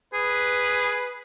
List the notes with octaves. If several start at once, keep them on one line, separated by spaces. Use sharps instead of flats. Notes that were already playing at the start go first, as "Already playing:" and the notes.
G#4 B4